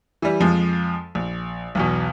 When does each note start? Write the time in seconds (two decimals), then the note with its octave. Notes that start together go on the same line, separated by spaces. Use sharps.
0.22 E3 G3
0.40 F2 F3 G#3
1.15 A#1
1.75 B1 E2 B2